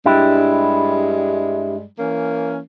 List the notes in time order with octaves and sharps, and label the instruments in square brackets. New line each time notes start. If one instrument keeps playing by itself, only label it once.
[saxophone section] G2 G3 G#3 [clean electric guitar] D4 E4 G4
[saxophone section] E3 A#3 C#4